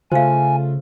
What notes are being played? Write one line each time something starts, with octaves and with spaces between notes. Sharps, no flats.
C#3 A3 F4 C5 F5 G#5